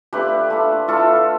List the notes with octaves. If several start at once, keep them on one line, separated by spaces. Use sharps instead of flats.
A3 D4 F4 G4 B4
A3 D4 F4
A3 E4 F4 A4